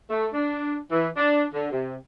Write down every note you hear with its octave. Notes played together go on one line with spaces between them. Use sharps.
A3
D4
E3
D4
D3
C3